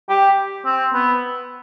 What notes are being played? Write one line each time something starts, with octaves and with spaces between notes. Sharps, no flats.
G4
C4
B3